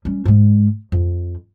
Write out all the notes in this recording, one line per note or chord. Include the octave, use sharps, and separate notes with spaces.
G3 C#4
G#2 G#3
F2